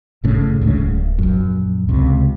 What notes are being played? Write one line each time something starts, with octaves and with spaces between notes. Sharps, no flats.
G1 A2 C#3
D2 G#2 C#3
D1
A#1 F#2
C#2 C3